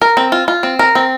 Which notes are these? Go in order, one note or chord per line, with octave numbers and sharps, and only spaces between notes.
A#4
C4
F4
F4
C4
A#4
C4